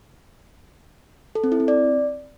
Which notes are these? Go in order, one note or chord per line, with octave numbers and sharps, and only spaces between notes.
A4
C4
E4
C4
D5